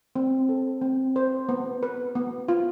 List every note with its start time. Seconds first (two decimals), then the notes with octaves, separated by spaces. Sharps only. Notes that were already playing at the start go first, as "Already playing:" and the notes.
0.16 C4
0.49 A4
0.82 C4
1.16 C5
1.49 B3
1.83 B4
2.15 B3
2.48 F4